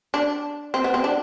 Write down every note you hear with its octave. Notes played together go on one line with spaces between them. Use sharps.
D4
C4
B3
C4
D4